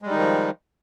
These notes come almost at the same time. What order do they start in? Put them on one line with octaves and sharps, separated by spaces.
G#3 G3 D#4 D#3 F3